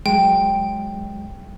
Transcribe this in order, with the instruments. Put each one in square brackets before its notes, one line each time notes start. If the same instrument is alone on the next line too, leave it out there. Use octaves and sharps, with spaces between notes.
[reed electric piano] F#3 G#3 [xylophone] G5